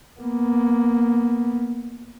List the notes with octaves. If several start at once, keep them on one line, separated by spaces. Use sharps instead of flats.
A#3 B3